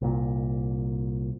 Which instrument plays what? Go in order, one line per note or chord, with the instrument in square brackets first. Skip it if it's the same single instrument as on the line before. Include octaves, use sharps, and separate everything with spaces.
[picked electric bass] C2 A#2